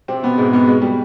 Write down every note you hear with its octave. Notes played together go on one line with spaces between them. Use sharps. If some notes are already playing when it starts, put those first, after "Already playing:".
C3 C4
B2 B3
G#2 G#3
B2 B3
G#3
G3